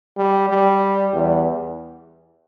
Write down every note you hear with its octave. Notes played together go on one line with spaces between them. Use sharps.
G3
G3
E2